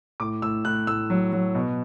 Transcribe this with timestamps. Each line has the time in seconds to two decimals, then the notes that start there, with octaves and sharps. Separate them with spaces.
0.20 A2 D6
0.42 A2 E6
0.65 A2 F#6
0.87 A2 E6
1.10 F#3
1.32 F#3
1.55 B2